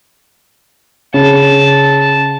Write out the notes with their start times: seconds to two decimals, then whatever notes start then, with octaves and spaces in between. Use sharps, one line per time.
1.14 C#3 A5